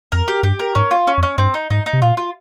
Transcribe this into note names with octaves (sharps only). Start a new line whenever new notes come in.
F2 A#4
G4
G2 G4
A#4
G#2 C#4
F4
C#4
F2
C#4
G2 C4
D#4
G#2 D#4
D#4
C3
A#2 F4
F4